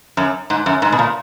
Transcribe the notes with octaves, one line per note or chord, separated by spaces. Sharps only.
F#2
G#2
F#2
G#2
B2
A#2